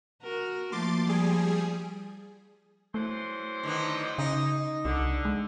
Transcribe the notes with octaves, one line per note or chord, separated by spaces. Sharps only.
F#4 A#4
F3 A3 A#3 C6 D6 A6
F3 G3 G#4
E3 F#3 A3 C5
D3 D#3 B3
C#3 D#4
C2 D3
G#3